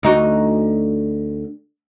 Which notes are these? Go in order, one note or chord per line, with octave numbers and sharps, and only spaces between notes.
D2 D#4 F#4